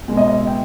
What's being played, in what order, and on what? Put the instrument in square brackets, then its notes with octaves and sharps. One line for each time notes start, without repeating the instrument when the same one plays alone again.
[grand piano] B2 G#3
D#5
D#5
E5
G5